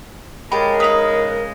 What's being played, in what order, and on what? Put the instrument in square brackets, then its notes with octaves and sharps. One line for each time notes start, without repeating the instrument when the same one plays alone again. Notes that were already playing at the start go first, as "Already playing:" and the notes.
[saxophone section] C#3 G#3 [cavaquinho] G4 A5 [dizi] A#4 [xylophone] B5
[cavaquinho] D#4 B4 [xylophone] D#6 B6 F7